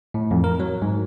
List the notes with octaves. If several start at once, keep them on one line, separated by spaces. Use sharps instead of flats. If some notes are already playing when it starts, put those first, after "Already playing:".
A2
F2
A#4
F#3
G#2